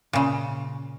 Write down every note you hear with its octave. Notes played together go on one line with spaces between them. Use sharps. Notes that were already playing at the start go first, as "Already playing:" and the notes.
A#2 C#3